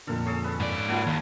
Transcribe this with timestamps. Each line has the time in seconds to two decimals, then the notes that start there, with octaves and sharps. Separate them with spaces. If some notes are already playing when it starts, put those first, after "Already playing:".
0.07 F2 A#2 D3 A4 A#4
0.26 C#4 G#4 A4
0.44 B4 E5 A5
0.60 G#2 D5
0.88 A#3 F4 F#4 A4 G#5
1.07 D#2